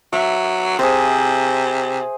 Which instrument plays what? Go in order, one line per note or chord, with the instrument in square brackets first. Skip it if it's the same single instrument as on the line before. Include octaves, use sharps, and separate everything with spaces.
[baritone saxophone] F#3 [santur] E5
[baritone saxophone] C3 [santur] G#4 C5